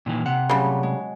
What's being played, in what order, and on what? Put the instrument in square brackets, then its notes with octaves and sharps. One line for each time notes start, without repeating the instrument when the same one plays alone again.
[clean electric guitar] A#2 D#3 E3
[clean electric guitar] C3 [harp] F#5
[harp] A2 F#3 [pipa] C#3 G3
[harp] G#3